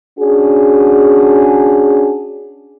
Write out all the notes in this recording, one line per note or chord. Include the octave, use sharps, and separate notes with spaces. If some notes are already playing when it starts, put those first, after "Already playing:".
C#4 D4 F#4 G#4